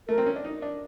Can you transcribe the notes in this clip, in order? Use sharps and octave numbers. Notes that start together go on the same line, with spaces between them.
A3 A#4
C4
C#4
D4
D#4
D4